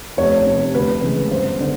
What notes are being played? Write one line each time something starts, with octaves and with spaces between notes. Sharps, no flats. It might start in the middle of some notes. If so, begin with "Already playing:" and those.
F1 C#5
F2 C3
D2 B4
C#3 E3 G#3
G1 C5
D3